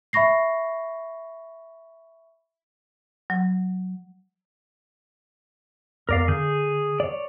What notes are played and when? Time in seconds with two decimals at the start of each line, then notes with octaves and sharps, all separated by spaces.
0.13 E5 B5 C#6 A#6 C7
3.30 F#3
6.09 F2 B3 A#4 D5 F5
6.28 D3 G#4 G6
7.00 C#5 D5